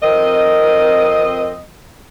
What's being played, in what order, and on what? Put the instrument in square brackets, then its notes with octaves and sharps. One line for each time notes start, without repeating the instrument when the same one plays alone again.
[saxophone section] F2 C4 D#5 [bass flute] A#4